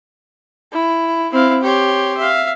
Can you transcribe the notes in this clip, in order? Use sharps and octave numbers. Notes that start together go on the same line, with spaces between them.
E4
C4 E4 F5
G4 C#5 C6
E5 F5